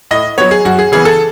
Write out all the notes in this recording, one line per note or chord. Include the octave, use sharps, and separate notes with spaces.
A2 D#5
F#3 B3 C#5
G#4
F#2 F#4
G#4
C#3 E3 B3 G#4
A4